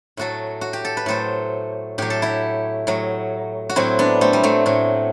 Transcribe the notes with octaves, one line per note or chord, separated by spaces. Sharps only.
A2 F#3 F#4 A4
F#4
G4
A4
B4
A2 F#3 A4 C5
A2 F#3 G4
A4
E4 G4
A2 F#3
F#4
A2 F#3 C4 E4
B3 D4
A3 C4
G3
F#3 A3
A2 F#3